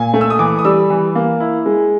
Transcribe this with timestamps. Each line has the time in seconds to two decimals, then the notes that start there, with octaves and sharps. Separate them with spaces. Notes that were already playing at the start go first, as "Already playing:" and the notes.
Already playing: A#2 G#5
0.14 A3
0.21 E6
0.30 D#6
0.39 E3 D6
0.59 D#6
0.65 G3 E6
0.90 E3
1.15 A#3
1.40 E4
1.66 G#3